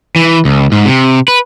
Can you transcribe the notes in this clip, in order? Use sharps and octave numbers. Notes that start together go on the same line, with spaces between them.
E3
C#2
G#2
C3
B4